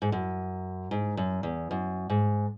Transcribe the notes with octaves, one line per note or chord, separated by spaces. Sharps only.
G#2
F#2
G#2
F#2
E2
F#2
G#2